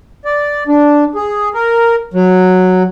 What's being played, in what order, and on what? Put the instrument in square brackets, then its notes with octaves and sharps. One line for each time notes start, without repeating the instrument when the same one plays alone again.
[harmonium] D5
D4
G#4
A#4
F#3